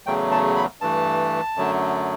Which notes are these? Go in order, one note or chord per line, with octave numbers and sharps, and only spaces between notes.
E2 C#3 F#3 A3 G5
A5
B5
G2 E3 A3 A5
F#2 D3 F#3 A3